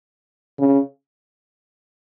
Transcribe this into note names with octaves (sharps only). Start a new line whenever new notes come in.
C#3